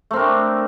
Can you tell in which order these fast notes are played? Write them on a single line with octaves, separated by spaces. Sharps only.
A3 C4 A#4 D4